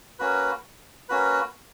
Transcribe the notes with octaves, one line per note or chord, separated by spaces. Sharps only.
A#3 C#4 F#4 B4
A#3 C#4 F#4 B4